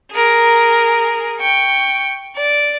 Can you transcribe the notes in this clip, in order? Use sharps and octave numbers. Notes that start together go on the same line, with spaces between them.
G#4 A#4
G5 C#6
D5